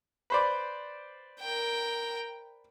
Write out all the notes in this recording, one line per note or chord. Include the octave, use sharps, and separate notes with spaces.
B4 C5 D5
A#4 G5